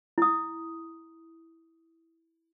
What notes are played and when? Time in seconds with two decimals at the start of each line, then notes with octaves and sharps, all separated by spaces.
0.18 E4 D#6